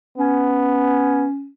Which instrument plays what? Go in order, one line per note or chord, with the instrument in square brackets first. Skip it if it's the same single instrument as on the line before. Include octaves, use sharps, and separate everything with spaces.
[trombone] B3 [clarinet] C#4